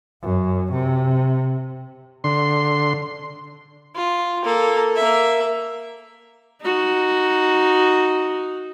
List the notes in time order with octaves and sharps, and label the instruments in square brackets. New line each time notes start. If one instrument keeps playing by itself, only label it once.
[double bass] F#2
C3
[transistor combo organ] D3 C6
[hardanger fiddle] F4
A#3 A4
A#3 E5
[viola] D#4 F#4